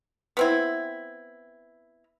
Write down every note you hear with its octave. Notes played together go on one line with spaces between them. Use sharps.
B3 C4 E4